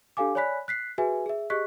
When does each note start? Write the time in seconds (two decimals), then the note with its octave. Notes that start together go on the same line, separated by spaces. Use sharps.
0.17 D4 G4 A4 F5 G#5 D6
0.35 C#5 D5 G#5 B5 F#6 B6
0.68 F#6 B6 C7
0.98 F#4 G#4 B4 E5 G#5
1.26 G#4 E5
1.50 G4 G#4 D#5 C#6 F#6 B6